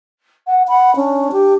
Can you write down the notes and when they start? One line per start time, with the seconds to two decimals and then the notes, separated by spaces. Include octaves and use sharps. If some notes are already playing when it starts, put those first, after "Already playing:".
0.47 F#5
0.68 F#5 B5
0.96 C#4 D4
1.32 G4